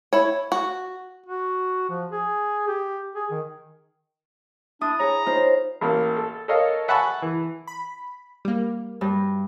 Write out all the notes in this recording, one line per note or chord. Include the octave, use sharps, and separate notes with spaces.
E4 C#5
F#4
F#4
F3
G#4
G4
G#4
D#3
D4 E4 D#6
G#4 C#5 A#5
D#4 F4 C5
A1 A#3
A4
A4 A#4 C#5 D#5 F5
E5 F#5 G#5 A5 B5 C#6
E3
B5
G3 A#3
G2